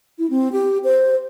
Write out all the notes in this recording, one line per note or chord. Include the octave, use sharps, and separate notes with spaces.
E4
C4
G4
C5